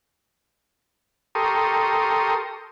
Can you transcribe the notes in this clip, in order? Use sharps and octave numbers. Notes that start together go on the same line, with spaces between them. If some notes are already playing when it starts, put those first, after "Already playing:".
G4 A4 A#4 C6 C#6 D#6